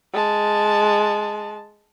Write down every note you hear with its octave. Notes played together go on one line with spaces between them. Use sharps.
G#3 A5